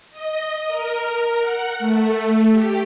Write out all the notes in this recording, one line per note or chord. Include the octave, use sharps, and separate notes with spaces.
D#5
A#4
F#5
A3
G4